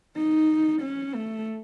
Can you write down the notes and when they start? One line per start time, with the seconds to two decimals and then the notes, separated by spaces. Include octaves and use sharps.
0.16 D#4
0.82 C#4
1.15 A3